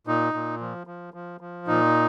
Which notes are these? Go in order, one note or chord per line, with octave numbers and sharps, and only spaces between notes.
A#2 D#4
A#2
F3
F3
F3
F3
A#2 D#4